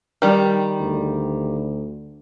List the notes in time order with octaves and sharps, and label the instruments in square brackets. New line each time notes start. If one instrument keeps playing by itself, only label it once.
[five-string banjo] D#3 G3
[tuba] D2